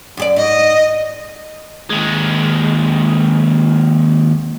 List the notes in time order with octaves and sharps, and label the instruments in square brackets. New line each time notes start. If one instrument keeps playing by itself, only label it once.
[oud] F#2 G#4 D5
[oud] G#2 [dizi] D#5
[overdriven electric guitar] D#2 G#3